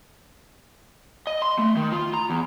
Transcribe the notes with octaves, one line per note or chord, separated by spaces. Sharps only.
D#5
C6
A3
D#3
F4
A#5
E2